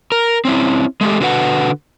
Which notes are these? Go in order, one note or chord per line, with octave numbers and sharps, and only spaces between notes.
A#4
C4 C#4 E4
G#3 A3 G4
D3 F#4 B4 F#5